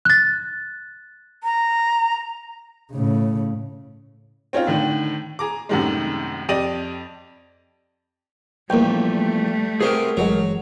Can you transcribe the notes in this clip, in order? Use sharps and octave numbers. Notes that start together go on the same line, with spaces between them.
F#6 A6
A#5
A2 C#3
C4 C#4 D#4 F4
A2 D3 D#3
G#4 A#5 D6
F#2 A2 C3 D#3 G3 G#3
F2 G4 D5 D#5 D#7 F#7
A#1 E2 G3 A3 A#3 G5
C2 C3 B3 G#4 A#4
G1 E3 F#3 G#3